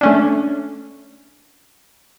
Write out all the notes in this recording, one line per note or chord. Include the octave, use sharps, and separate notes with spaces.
A3 C#4 D4